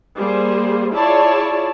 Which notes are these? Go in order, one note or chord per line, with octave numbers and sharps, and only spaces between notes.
G3 A#3 G#4 C5
E4 F4 G#4 C#5 D5 A5